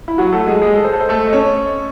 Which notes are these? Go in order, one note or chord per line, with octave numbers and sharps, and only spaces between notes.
E4
F#3 F#4
A3 A4
G#3 G#4
G#3 G#4
A4
C5
A4
C5
A3 A4
D#5
C#4 C#5